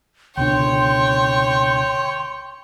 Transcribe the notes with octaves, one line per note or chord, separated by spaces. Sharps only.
C#2 B2 D3 C#5 G5 C6